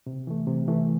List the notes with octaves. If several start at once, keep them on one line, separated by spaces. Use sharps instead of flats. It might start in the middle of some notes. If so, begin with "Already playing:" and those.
C3
E3 A3
C3
E3 A3